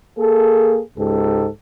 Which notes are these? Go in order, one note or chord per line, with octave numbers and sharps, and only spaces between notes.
A#3 G#4 A4
C#2 G#2 G4 A4